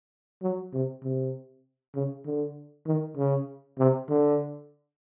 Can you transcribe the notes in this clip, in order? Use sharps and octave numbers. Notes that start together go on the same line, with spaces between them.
F#3
C3
C3
C#3
D3
D#3
C#3
C3
D3